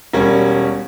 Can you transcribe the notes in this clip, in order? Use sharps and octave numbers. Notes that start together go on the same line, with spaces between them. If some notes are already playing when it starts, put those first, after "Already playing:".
E1 G3 C#4 A#4 C#5